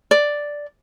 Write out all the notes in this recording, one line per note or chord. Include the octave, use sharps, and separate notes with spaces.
D5